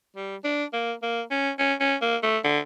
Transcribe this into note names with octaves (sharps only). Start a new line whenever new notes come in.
G3
D4
A#3
A#3
C#4
C#4
C#4
A#3
A3
D3